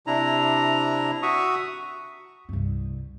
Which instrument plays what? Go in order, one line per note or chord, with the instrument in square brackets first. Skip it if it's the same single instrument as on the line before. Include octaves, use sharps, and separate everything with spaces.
[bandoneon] C3 D4 E4 A#5
F#4 E5 C#6 D#6
[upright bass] C2 G2